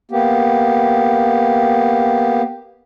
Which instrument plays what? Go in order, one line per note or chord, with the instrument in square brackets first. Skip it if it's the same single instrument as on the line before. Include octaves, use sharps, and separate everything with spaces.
[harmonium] A#3 B3 G4